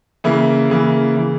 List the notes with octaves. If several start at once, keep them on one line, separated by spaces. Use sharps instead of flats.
C#3 E3 A#3 E4
C#3 E3 A#3 E4
C#3 E3